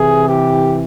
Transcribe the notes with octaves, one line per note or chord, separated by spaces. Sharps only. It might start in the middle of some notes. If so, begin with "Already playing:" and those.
Already playing: C3 E3 G#4
G4